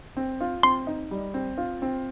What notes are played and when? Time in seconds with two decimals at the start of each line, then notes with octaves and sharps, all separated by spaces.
0.17 C4
0.41 F4
0.63 C4 C6
0.87 D#4
1.11 G3
1.34 C4
1.58 F4
1.82 C4